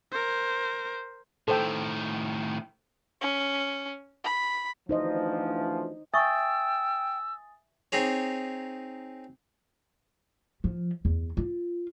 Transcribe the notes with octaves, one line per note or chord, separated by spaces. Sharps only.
A#4 C5
A2 D#3 A4 C5 G5
C#4
B5
D2 E3 F3 D#4 C5 D#5
E5 G5 G#5 C#6 D#6 E6 A6
C4 D#4 G#4 C#5
F3
E2
F4